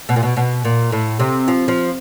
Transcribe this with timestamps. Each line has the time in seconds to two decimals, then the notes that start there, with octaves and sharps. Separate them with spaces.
0.09 B2
0.16 A#2
0.23 B2
0.36 B2
0.65 A#2
0.92 A2
1.20 C3
1.48 F3
1.68 F3